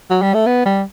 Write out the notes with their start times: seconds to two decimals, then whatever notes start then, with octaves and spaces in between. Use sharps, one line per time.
0.10 F#3
0.22 G3
0.34 A3
0.46 B3
0.66 G3